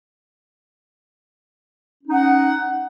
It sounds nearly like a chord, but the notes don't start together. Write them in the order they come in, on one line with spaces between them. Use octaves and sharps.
C#4 D#4 F#5